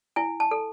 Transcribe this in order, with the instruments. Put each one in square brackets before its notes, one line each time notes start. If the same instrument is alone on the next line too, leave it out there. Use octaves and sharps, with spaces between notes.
[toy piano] E4 G#5
A5
A4